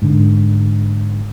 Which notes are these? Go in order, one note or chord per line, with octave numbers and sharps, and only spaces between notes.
G#2 D3